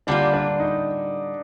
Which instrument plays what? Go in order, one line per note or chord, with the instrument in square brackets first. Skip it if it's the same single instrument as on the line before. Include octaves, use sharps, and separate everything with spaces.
[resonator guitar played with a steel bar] D3 G3 A#3 F4 [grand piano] D4
[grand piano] D4
D#4